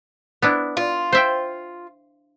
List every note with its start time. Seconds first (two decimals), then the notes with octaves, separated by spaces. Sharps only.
0.42 B3 D4 E4
0.77 F4
1.12 C5 E5 G5